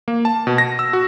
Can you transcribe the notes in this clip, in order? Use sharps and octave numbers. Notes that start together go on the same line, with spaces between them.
A#3
A5
B2
A#6
E6
F#4